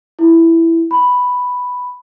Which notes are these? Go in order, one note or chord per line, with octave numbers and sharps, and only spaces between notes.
E4
B5